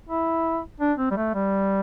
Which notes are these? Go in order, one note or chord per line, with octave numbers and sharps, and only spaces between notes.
E4
D4
C4
G3
A3
G3